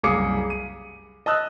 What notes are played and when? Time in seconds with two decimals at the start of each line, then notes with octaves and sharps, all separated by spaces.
0.03 F#1 C2 G#4 F5 D6 C#7
0.50 D#7
1.26 D#5 A5 D#6 E6 F#6